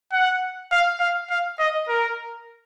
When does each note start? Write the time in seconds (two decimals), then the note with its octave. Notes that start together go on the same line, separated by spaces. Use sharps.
0.13 F#5
0.72 F5
1.00 F5
1.30 F5
1.59 D#5
1.88 A#4